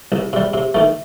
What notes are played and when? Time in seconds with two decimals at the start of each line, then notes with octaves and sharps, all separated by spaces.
0.12 C2
0.33 C3 G3
0.53 C3
0.74 D#3 A3